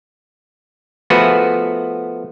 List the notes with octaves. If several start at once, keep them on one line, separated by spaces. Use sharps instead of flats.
F3 A3 B3 F#4 G#4 B4